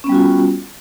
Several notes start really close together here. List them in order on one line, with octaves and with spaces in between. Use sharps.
C#4 B3 G3 F#4 F4